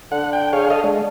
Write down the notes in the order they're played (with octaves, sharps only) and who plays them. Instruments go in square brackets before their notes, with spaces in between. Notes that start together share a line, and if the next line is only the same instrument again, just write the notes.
[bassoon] D3 [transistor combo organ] F#5
[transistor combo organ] G5
G#4 C#5 F5
A4 D#5 F5
[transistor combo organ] G#3 [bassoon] D4